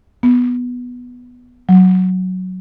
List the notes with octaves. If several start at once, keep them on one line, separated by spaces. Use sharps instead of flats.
B3
F#3